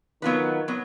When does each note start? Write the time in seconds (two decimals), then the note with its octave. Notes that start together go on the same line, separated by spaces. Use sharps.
0.22 D#3 F#3 B3 F4 B4
0.68 F#3 B3